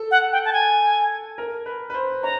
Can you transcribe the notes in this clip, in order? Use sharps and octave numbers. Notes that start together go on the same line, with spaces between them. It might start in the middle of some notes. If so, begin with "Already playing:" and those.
Already playing: A4
F#5
G5
A5
G#5
A#4
B4
B4
C5
C#5 A#5